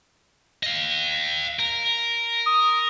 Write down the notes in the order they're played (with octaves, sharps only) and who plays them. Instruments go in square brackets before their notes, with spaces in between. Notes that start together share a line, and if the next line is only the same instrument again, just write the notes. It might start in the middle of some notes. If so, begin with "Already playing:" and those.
[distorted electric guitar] D#5 F5
A#4
[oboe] D#6